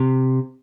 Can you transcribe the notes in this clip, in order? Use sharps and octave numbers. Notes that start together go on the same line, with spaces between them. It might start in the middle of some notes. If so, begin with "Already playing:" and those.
Already playing: C3